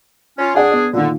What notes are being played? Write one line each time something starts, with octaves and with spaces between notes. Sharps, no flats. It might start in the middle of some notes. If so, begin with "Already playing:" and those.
C#4 F4
D4 G#4 D5 F#5 G#5
B3 D5
A#2 D3 D#3